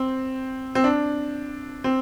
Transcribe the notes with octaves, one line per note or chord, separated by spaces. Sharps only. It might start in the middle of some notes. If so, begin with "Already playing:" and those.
Already playing: C4
C4
D4
C4